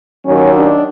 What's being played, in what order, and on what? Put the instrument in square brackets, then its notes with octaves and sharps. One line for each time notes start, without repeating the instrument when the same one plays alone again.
[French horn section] D#2 D#3 F#3 C#4
D4